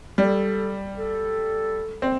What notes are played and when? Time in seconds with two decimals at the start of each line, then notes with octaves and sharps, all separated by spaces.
0.18 G3 A4
0.97 A4
2.02 C4